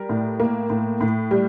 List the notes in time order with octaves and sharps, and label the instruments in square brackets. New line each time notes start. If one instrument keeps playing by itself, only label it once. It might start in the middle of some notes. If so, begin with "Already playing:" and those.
Already playing: [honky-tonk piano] G3 A#4
A2
A#3
A2
A2
G3